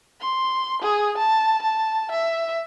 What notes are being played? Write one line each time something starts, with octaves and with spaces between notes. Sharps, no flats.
C6
G#4
A5
A5
E5